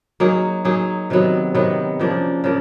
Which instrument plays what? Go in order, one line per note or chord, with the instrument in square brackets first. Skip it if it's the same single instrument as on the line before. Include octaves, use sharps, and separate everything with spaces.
[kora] F#3 A#3 D#4 G#4
F#3 A#3 D#4 G#4
C3 D#3 F#3 B3
C3 D#3 F#3 B3
C#3 F3 A#3 D4
C#3 F3 A#3 D4